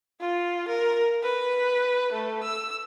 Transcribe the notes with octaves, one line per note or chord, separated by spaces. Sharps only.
F4
A#4
B4
A3
E6